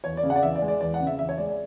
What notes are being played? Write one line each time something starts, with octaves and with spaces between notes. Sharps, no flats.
E2 C#5
D5
C#3
F#5
D5
E2 E5
D5
G#3
D5
E2 D5
F#5
C#3
E5
E2 E5
C#5
G#3 D5
D5